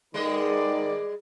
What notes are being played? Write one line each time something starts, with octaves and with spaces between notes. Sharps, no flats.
G#2 D#3 G3 G#3 B4 D5 D#5